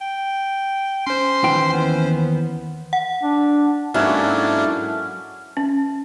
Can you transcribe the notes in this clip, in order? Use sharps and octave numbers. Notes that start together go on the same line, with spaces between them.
G5
C#4 C5 C6
D#2 E3 G5
B3
F#5
D4
G#2 F#3 A#3 C#4 D4 E4 A4 F#5
C#4